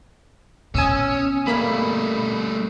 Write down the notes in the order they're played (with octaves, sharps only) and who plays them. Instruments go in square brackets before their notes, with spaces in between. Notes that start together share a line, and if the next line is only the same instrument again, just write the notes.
[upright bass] B2 [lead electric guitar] C#4 [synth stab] G#5 D#6 E6
[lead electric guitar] G3 A3 [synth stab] A#3 B5